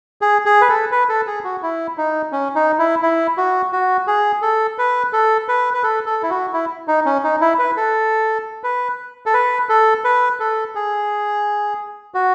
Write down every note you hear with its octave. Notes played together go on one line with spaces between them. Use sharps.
G#4
G#4
B4
A4
B4
A4
G#4
F#4
E4
D#4
C#4
D#4
E4
E4
F#4
F#4
G#4
A4
B4
A4
B4
B4
A4
A4
E4
F#4
E4
D#4
C#4
D#4
E4
B4
A4
B4
A4
B4
A4
B4
A4
G#4
F#4